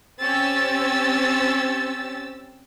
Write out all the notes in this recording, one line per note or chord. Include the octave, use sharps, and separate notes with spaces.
C4 C#4 G4 E6 A6